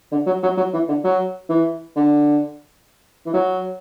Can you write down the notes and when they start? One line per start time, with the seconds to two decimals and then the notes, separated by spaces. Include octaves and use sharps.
0.12 D3
0.26 F#3
0.43 F#3
0.57 F#3
0.73 E3
0.89 D3
1.04 F#3
1.49 E3
1.96 D3
3.26 E3
3.34 F#3